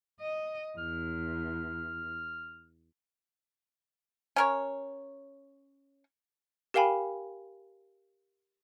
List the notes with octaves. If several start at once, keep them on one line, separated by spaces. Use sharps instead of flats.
D#5
E2 F6
C#4 A#4 C#5
G4 A#4 F5 G5 G#5 B5